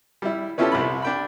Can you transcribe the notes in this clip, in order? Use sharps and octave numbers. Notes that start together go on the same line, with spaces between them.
G3 E4
B3 C#4 E4 F4 G4 A4
C2 C3 B5
D4 G5 B5